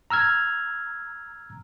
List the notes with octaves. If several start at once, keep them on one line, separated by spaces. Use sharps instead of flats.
A#5 E6 F6 G#6